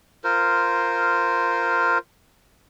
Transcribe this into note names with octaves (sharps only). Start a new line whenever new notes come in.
F4 A#4 C5